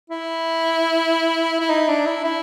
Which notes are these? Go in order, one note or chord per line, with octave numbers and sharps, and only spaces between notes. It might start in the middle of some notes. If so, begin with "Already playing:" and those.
E4
E4
D#4
D4
E4
E4